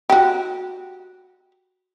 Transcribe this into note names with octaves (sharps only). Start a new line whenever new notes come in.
F#4 G4